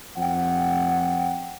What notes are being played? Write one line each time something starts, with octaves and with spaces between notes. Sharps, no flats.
F2 F3 F#5 G5